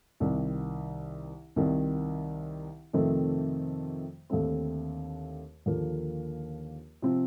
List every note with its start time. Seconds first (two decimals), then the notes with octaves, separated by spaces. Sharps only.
0.20 C2 C3 D#3
1.56 C2 C3 D#3
2.93 F2 C3 D#3 A3 C4
4.30 D#2 D3 A3 C4
5.66 D#2 D3 F3 A#3
7.02 C3 F3 C4